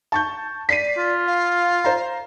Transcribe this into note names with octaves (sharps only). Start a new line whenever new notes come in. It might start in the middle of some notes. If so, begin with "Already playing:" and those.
A5 C#6 G6
D5 B6 C7 D#7
F4
F5
C5 A#5